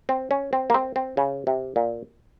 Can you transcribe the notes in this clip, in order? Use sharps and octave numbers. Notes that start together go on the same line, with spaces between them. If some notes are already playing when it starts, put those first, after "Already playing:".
C4
C#4
C4
A#3
C4
C4
C#3
C3
A#2